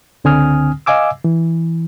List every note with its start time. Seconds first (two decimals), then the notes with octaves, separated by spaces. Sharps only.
0.24 C#2 D3 C4 G#5 D#6 F6
0.86 D#5 F5 G#5 D6 E6
1.24 E3